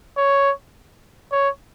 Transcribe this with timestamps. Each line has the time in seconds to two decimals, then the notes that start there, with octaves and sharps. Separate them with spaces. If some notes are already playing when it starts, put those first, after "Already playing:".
0.17 C#5
1.32 C#5